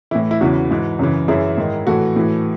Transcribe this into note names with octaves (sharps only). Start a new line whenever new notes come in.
A2 E3 E4
E4
E2 C#3 E3 F#4
G#2 E3
F#2 C#3 E3
F#2 E3 E4 G#4
G#2 D#3
A2 E3 F#4 A4
A2 E3